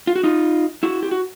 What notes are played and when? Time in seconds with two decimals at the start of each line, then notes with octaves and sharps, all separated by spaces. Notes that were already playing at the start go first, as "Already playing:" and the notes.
0.07 F4
0.16 F#4
0.23 D#4 F4
0.83 E4 F#4
1.03 G4
1.11 F#4